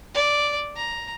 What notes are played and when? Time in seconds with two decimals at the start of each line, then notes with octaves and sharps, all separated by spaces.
0.14 D5
0.76 A#5